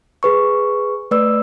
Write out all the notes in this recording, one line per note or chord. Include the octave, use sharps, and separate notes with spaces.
G#4 B4 C#6
A3 B4 D5 E6